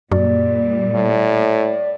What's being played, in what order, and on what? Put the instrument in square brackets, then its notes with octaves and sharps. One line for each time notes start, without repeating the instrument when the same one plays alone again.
[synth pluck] F#2 [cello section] A#2 G3 [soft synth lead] D5
[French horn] A2